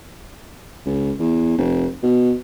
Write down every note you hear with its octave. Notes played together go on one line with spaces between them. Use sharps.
C#2
E2
F1
B2